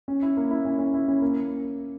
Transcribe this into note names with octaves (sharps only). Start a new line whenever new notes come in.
C#4
E4
A#3
E4
C#4
C#4
E4
C#4
A#3